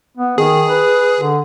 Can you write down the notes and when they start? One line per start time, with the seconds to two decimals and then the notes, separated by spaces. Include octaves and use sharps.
0.17 B3
0.38 D#3 G#4
0.68 B4
1.20 D3